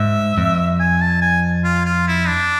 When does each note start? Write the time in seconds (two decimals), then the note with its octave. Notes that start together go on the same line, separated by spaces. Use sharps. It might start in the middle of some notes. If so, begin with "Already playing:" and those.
Already playing: G#2 E5
0.38 F2
0.79 G#5
1.01 A5
1.22 G#5
1.64 F4
1.86 F4
2.08 E4
2.28 D4